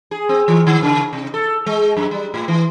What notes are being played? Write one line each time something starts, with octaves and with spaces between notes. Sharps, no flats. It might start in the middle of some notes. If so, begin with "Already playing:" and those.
G#4
C4
E3
D#3
C#3
C3
A4
G#3
F#2
G3
A2
E3